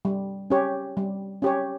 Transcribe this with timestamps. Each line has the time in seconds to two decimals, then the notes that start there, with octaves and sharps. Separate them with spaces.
0.05 G3
0.50 C#4 G4 C#5
0.97 G3
1.42 C#4 G4 C#5